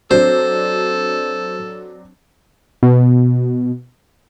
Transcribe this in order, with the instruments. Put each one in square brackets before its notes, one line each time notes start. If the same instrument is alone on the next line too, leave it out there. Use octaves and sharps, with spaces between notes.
[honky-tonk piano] F#3 C4 D4 [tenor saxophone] A4 [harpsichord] C5
[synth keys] B2